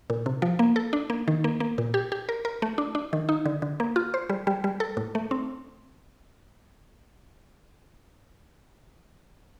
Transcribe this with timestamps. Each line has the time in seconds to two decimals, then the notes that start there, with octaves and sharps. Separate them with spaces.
0.10 A#2
0.26 C3
0.42 F3
0.59 A#3
0.76 A4
0.93 D4
1.10 A#3
1.28 D#3
1.44 A#3
1.60 A#3
1.78 A#2
1.94 G4
2.12 G4
2.29 A#4
2.45 A#4
2.62 A3
2.78 D4
2.95 D4
3.13 D#3
3.29 D#4
3.45 D3
3.62 D3
3.80 A#3
3.96 F4
4.14 C5
4.30 G3
4.47 G3
4.64 G3
4.80 A4
4.97 A2
5.15 A3
5.31 C4